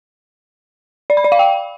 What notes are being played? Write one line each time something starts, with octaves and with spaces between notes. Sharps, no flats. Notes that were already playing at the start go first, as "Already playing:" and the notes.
D5
B5
D5
F5
G5